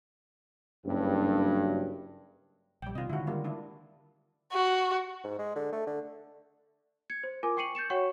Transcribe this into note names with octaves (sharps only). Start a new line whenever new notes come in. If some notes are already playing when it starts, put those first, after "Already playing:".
F#1 G2
A#1 G3 G5
C3 D#3 F4 D#5
D3 D#3 G#3 E4 F#4
G3 A#3 F4
D4 E4
F#4
G#2
G#3
D3
A3
D3
G#6 C#7
C5
F4 A#4 G#5 D6
G5 C#6 C7 C#7 D#7 F#7
G6 A6 C#7 E7
F#4 C#5 F#5 G5 C#6